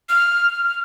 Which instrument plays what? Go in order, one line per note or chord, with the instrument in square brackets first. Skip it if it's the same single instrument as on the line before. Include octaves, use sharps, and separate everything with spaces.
[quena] F6